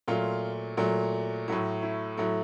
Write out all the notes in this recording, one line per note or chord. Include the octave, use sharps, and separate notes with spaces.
A#2 F#3 A3 F4
A#2 F#3 A3
A2 F#3 A3 E4
E4
A2 F#3 A3